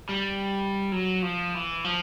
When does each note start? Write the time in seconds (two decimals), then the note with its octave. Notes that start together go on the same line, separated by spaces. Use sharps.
0.09 G3
0.92 F#3
1.22 F3
1.54 E3
1.84 F3